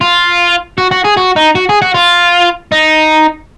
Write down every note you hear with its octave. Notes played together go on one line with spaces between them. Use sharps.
F4
F#4
F#4
G#4
F#4
D#4
F#4
G#4
F#4
F4
D#4